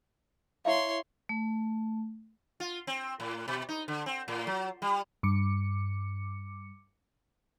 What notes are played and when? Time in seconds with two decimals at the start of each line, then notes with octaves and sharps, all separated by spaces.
0.65 E4 C#5 E5 F5 C6
1.29 A3
2.60 F4
2.87 C4
3.20 A2
3.48 B2
3.69 D#4
3.88 D3
4.06 C4
4.28 A2
4.47 F#3
4.82 G3
5.23 G2 D6 C#7